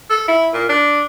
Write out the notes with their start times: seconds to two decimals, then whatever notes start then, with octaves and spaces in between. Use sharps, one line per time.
0.10 A4
0.28 E4
0.54 A#2
0.69 D4